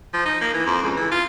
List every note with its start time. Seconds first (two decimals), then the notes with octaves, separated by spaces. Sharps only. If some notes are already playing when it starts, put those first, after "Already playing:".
0.14 F3
0.25 D#4
0.41 A#3
0.54 E3
0.66 F2
0.82 C#2
0.96 E3
1.11 F4